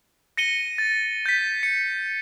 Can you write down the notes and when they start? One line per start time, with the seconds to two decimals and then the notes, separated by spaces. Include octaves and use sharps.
0.37 A#6 C#7 D#7 G7
0.78 A6
1.26 G6 B6
1.63 C#7